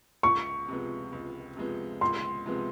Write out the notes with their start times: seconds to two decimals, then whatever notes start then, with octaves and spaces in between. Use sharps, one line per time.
0.23 C#2 C#6
0.68 C3 F3 G#3 B3
1.12 C#2
1.57 C3 F3 G#3 B3
2.01 C#2 C6
2.46 C3 F3 G#3 B3